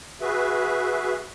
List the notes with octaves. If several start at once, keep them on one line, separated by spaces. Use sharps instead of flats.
F#4 G#4 B4 E5